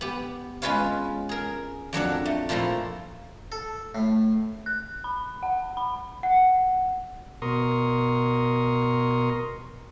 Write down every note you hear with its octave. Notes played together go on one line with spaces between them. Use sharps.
B3 G4
G#3 C#4 F4 B4 C#5 F5
G#4 A#4
F2 F#3 D4 F#5
A3
A#2 F3 A3 E4 A#5 C6
A4
A2
F#6
B5
F#5
B5
F#5
B2 A#4 A#5 C6 C#6 D#6